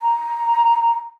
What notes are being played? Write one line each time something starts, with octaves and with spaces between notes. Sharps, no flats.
A#5